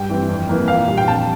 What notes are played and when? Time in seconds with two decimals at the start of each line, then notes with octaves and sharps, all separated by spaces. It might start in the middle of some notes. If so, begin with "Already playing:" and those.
Already playing: G2 G5
0.09 E3 G3 C4
0.29 F2
0.49 E3 A#3
0.68 A#2 F5
0.88 G3 D4
0.97 G5
1.07 F2 A5